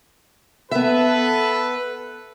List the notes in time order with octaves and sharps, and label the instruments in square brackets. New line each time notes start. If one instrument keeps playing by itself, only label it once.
[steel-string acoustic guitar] B3 E5 [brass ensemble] A4 B4